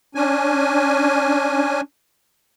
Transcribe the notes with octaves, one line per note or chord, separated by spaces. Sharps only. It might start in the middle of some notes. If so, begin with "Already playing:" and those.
C#4 D4 G#5